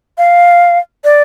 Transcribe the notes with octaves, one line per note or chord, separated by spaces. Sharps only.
F5
D5